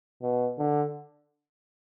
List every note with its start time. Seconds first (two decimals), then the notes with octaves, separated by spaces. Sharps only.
0.22 B2
0.58 D3